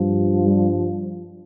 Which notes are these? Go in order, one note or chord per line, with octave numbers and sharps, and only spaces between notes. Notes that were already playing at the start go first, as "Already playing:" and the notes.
Already playing: G2 F3
G3